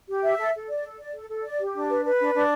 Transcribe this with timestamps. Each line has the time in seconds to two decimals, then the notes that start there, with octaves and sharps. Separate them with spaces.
0.09 G4
0.24 E5
0.39 A4
0.54 A4
0.69 D5
0.84 A4
0.99 D5
1.14 A4
1.30 A4
1.44 D5
1.59 G4
1.74 D4
1.89 B4
2.05 B4
2.20 D4
2.35 D4